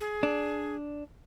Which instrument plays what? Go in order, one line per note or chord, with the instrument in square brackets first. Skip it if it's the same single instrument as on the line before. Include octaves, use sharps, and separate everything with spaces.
[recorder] G#4
[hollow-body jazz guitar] D4